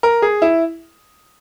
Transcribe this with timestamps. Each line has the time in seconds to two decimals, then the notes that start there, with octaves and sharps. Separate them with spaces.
0.03 A#4
0.22 G#4
0.42 E4